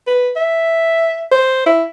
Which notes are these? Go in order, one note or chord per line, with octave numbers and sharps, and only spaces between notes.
B4
E5
C5
E4